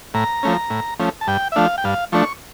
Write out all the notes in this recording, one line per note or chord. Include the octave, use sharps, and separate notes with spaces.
A2 A#5
F3 A3 C#4
A2
F3 A3 C#4
A5
G2 G5
E5
F3 A3 D4 F5
G5
G2 F5
F3 A3 D4 C#6